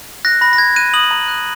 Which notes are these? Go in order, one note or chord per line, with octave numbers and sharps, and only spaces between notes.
F#6 A#6
B5 A#6
A#6
B5 G#6
F#6 D#7
D#6 F#7
A#5
F#6